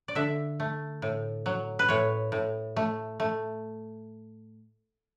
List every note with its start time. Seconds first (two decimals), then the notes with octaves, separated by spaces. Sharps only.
0.08 D5
0.15 D3 E5
0.60 A3
1.02 A2
1.46 F#3
1.79 B4
1.89 A2 C#5
2.32 A2
2.76 A3
3.20 A3